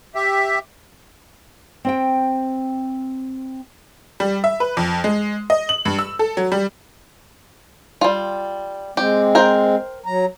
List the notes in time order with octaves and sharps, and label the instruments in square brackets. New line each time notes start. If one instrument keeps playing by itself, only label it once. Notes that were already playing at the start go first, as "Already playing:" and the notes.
[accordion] G4 E5
[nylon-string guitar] C4 C5 G5
[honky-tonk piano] G3
E5
B4
F2
G#3
D#5
F#7
G2
E6
A4
F#3
G3
[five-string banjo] G3 F4
[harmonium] G#3 C4 [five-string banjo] G4
[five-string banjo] A#4 C5 G5
[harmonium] F#3 A#5